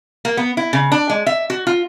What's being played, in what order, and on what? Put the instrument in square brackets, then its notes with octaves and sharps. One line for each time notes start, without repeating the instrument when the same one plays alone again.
[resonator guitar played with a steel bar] A#3
B3
E4
C#3
D4
G#3
E5
F#4
F4